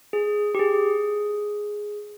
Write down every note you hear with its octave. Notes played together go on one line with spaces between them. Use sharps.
G#4
G4
G#4